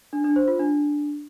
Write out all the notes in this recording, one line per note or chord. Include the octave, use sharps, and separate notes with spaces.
D4
D4
C5
F4
D4